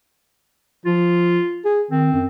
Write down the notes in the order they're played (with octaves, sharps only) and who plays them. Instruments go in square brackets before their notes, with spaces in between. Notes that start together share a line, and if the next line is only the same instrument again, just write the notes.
[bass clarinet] F3 [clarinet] F4
[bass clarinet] G#4
[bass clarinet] D#3 [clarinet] C4
[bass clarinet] F#2